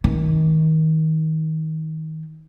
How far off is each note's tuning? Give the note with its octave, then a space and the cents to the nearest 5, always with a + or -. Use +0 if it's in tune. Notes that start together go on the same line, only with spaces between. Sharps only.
D#3 +25